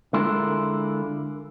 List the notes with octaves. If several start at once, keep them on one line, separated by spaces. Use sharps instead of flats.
D3 G#3 E4 F4 A#4